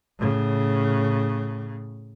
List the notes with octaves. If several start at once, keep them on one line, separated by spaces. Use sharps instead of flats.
A2 C#3